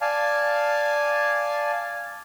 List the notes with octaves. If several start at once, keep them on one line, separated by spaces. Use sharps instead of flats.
D5 F5 G#5 A5